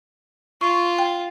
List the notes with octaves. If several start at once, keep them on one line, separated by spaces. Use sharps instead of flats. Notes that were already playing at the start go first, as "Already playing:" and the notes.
F4 C#6
G5